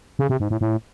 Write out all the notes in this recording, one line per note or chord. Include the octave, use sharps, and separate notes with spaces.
C#3
C3
G#2
A2
A2